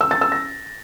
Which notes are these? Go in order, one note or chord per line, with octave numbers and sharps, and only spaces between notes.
E6
A6
E6
A#6